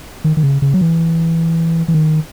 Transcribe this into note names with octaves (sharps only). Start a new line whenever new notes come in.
D#3
D#3
C#3
C#3
F#3
E3
E3
D#3